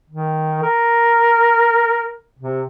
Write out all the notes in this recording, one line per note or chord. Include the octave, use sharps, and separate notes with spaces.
D#3
A#4
C3